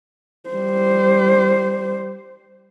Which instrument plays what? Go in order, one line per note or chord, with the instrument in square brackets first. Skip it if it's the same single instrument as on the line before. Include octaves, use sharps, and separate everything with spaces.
[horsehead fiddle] G3 C5